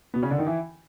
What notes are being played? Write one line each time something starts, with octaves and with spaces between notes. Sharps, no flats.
B2 B3
C#3 C#4
D3 D4
D#3 D#4
E3 E4